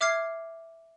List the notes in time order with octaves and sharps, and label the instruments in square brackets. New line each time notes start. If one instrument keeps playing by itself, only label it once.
[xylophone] E5 D6 F6 G#6 C7